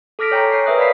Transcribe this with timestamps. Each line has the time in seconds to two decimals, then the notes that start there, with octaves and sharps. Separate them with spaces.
0.19 A4 D6 F6 A#6 B6 D7
0.31 C#5 G5 G#5 A#5
0.52 C#5 C7
0.66 A#4 B4 E5 D#6 F#6
0.78 D5 F5 B5 B6 C7